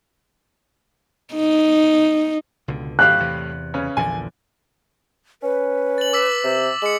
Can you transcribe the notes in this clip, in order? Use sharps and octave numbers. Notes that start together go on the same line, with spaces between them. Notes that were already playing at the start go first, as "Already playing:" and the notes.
D#4
C#2 B2 D3
F#2 A2 D3 G4 F5 F#6
E2 C3
C#3 C#4 B4
A#1 E2 D3 G#5
C#4 B4
A6 F#7
D6 E6 B6
C3
G#3 C#7 F#7